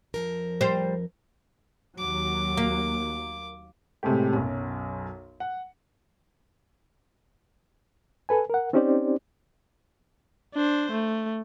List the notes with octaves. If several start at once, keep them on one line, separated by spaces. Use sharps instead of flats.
F2 F3 A#4
G3 C5
D#2 F#3 D6
A#3
A2 C3 G#3 A3 G4
B1 F#2
F#5
A4 B4 G#5
A#4 F#5
C4 C#4 D#4 G4 C5 D5
D4 C5
A3